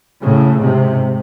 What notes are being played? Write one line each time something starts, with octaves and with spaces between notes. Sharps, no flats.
A2 C#3
G#2 C3